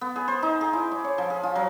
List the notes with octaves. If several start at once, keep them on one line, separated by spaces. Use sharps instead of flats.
B3
G#4
C5
D#4
G#4
E4
D6
C#5
F3
G#4
F4
F#3